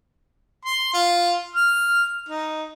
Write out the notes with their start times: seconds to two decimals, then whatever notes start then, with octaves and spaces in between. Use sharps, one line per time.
0.65 C6
0.93 F4
1.56 F6
2.29 D#4